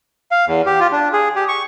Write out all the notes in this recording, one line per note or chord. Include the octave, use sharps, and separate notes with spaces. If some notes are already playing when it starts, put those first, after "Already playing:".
F5
E2
G4
F4
D4
G#4
G4
C#6